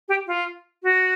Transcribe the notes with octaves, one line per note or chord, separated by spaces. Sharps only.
G4
F4
F#4